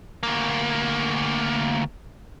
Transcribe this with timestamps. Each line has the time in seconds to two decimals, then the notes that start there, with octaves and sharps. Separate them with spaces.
0.23 D2 A#3